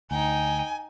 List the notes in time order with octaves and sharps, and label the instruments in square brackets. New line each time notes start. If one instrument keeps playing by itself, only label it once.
[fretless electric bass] D2 [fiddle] D#4 G5 [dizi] G#5